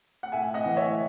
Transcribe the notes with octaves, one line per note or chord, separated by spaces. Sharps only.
F#5
A2 E5 G#5
D#5 F#5
E3
C#5 E5